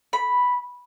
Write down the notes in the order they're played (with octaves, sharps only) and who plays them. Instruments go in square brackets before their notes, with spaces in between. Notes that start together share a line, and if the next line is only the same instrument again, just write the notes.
[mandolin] B5